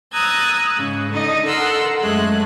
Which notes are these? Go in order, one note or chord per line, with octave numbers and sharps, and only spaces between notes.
A#5 D#6 E6 F#6 G#6 A6
G#2 C#3
D3 D#4 D#5
A4 A#4 F#5 C6 E6
F#2 G#3 A3 F#6